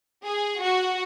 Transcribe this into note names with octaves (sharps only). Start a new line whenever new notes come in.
G#4
F#4